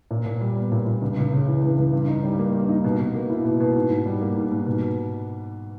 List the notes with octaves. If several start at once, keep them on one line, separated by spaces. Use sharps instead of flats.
A#2
A#2
G3
B3
A#2
A#2
C#2
C#2
C#3
E3
C#2
C#2
G2
D#4
G3
A#3
G2
D#4
B2
B2
A#3
E4
B2
B2
G#2
G#2
G3
A#3
G#2
G#2
B2